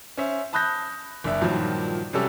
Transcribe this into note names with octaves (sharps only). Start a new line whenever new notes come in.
C#4 C5 E5
A5 B5 D#6 F#6 G6 A#6
F#1 D4 E5
G2 A#2 D#3 F3 F#3
C3 F#3 G3 C#4 A4 E6